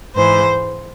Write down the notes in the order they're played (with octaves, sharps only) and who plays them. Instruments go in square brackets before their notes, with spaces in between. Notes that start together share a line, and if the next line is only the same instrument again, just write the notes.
[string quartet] G#2 E3 C5